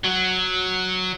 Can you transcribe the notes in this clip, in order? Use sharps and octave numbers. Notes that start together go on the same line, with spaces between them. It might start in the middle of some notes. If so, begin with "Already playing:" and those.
F#3